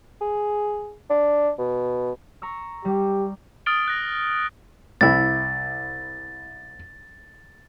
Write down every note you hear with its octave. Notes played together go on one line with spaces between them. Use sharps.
G#4
D4
B2
A#5 C#6 E6
G3 G4
D#6 F6 A6 D7 G7
F#6 A#6
C2 E4 A6